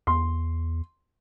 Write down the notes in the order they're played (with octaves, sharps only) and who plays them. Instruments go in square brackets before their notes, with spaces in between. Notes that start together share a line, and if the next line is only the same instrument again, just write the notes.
[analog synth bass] E2 [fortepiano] C6